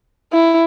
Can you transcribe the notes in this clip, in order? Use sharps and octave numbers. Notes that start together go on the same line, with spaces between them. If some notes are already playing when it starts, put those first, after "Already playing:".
E4